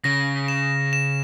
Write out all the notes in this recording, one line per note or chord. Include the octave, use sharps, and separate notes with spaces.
C#3 A#6
E7
E7